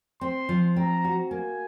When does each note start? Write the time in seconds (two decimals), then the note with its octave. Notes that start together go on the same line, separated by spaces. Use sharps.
0.21 C4 C6
0.49 F3
0.76 C4 A#5
1.04 F#4
1.31 A#3 G#5